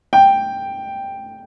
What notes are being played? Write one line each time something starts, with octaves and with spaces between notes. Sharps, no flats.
G5